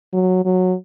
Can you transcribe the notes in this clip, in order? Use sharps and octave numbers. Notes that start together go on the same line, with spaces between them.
F#3
F#3